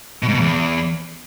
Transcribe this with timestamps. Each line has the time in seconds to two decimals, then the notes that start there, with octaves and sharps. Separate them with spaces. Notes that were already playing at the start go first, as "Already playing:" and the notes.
0.23 B2
0.28 G#2
0.34 B2
0.40 E2